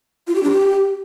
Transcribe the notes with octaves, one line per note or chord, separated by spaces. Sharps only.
F4
G4
D4
G4